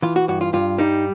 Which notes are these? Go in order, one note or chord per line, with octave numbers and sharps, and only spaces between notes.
E3 F4
F#4
G2 F#4
F4
G2 F4
G3 D#4